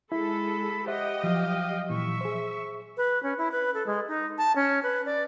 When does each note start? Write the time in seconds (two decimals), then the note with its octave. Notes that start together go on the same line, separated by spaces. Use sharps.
0.12 G#3 E4 A4 B5
0.87 G4 C5 D#5 E5 F#5 G5
1.24 F3 F#3 F5
1.90 A#2 E3 E5 C#6
2.21 G#4 C5
2.97 B4
3.23 C#4
3.38 E4
3.52 B4
3.74 A4
3.87 G#3
4.08 D#4
4.38 A5
4.56 C#4
4.83 B4
5.06 D5